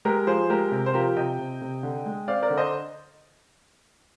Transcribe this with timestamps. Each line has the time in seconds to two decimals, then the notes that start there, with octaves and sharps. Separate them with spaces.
0.05 G#3 G4 A#4
0.27 F3 G#4 C5
0.50 G#3 G4 A#4
0.72 C3
0.86 C5
0.94 F3 G4 A#4
1.16 C3 D#5 G5
1.39 C3
1.62 C3
1.83 D3
2.06 G#3
2.28 C4 D5 F5
2.42 A#4 D5
2.50 D3
2.58 C5 D#5